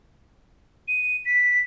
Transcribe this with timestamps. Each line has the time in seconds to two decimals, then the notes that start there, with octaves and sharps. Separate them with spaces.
0.88 D#7
1.25 B6